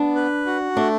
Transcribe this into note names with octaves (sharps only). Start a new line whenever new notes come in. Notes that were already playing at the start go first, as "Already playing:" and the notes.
Already playing: B3 D4
B4
F#4
A3 D4